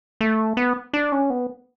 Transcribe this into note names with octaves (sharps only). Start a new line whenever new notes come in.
A3
B3
D4
C#4
B3